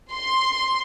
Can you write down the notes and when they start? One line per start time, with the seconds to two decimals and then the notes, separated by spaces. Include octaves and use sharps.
0.14 C6